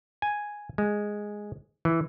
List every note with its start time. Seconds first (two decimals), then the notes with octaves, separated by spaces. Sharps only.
0.22 G#5
0.78 G#3
1.85 E3